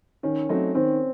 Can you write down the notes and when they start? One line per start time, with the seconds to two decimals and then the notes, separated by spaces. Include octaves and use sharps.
0.23 D#3 C#4
0.49 F#3 A3 C4 D#4
0.75 D#3 C4